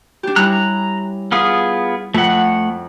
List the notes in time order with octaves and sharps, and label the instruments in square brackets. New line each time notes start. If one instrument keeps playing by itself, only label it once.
[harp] D4 G4
[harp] G3 C#4 E4 [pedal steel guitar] A#5 F#6
[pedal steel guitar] B3 F4 G#4
[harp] F2 [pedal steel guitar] A3 F#5